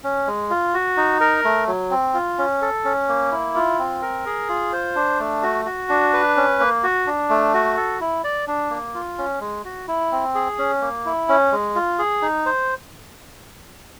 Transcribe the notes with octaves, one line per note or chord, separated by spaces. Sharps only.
C#4
G#3
F4
F#4
D#4
A#4
A3
F#3
C4
F4
C#4
A4
C#4
A#3
E4
F4
C4
A#4
G#4
F4
C5
D4
A3
F#4
F#4
D4
B4
C#4
A#3
F#4
D4
A3
F#4
A4
E4
D5
D4
A#3
F4
C#4
G#3
F#4
E4
C4
G#4
C#4
A#3
E4
C#4
G#3
F4
G#4
D#4
C5